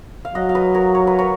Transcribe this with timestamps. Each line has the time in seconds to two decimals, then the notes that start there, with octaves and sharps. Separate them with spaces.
0.25 F5
0.35 F#3 D#5 F#5
0.49 F5
0.55 B4 D#5
0.75 A#4 C#5
0.95 C#5
1.07 B4
1.19 A#4 C#5